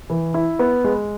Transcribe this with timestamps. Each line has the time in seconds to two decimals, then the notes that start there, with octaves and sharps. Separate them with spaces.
0.10 E3
0.34 E4
0.59 B3
0.84 G#3